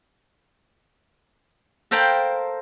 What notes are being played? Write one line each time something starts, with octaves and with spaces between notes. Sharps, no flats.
A4 A#4 C5 F5 G5 B5